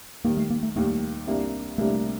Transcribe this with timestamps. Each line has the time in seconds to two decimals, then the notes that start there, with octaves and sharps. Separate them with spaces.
0.24 D#2 D#3 G3 A#3
0.37 A3
0.50 A#3
0.63 A3
0.76 D#2 D#3 G3 A3
1.27 C2 C3 G3 A#3 D4
1.78 C2 C3 G3 A3 A#3 D4